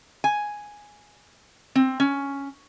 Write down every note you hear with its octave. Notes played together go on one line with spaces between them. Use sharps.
G#5
C4
C#4